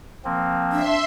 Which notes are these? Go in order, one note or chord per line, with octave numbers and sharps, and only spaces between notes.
F3 A#3 C4
D4 E5 C6